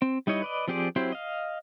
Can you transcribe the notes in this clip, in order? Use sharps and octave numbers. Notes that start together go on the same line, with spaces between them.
C4
G3 D#4 E4 C#5 D#5
B4 D5 D#5
F3 C4 G4 G#4 D5
F#3 C4 E4 G4 C5
D#5 F5